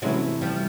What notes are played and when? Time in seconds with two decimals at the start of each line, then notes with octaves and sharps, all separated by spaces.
0.02 C3 E3 F#3 G#3 A3 C#4 E4
0.41 F3 G3